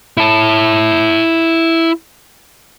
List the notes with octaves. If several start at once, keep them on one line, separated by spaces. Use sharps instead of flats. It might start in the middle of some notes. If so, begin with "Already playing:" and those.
E4 A5